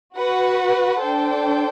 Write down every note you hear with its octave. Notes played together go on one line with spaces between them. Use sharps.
F#4 B4 F#5
D4 A4 C5 G5